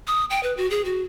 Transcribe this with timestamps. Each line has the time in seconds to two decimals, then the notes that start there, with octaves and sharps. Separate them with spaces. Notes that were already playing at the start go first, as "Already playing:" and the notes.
0.07 D#6
0.30 G5
0.43 B4
0.57 F#4
0.70 G#4
0.85 F#4